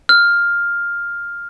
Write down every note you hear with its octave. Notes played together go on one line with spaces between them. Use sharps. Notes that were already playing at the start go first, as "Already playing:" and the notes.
F6